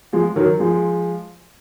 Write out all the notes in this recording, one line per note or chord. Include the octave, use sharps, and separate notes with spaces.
F3 G#3
D#3 F#3
F3 G#3